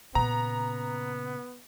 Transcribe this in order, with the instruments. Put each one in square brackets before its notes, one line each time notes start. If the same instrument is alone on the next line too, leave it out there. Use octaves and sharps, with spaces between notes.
[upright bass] A#2 C#3 [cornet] B3 [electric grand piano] A#5